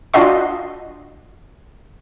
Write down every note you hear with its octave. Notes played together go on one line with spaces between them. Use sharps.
D4 F4 F#4 D#5 C6